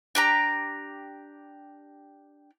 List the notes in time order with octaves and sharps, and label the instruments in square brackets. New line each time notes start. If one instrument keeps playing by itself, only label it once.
[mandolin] D4 G4 A#5